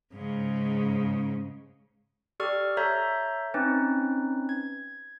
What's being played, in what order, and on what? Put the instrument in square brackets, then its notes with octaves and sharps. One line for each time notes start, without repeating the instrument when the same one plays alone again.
[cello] G#2 C#3
[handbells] G4 A4 D5 C#6 F6
A4 C#5 E5 A#5 G6
C4 C#4 D#4 B4
G#6